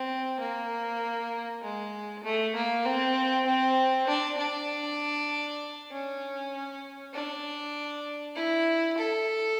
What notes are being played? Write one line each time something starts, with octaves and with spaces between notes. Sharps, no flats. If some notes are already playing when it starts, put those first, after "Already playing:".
Already playing: C4
A#3
G#3
A3
A#3
C4
C4
D4
D4
C#4
D4
E4
A4